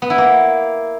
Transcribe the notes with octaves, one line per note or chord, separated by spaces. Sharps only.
B3
E4
A#3